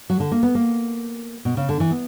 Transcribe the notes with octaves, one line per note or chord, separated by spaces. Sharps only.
F#3
D3
A#3
B3
A#3
B2
C#3
D3
E3
B3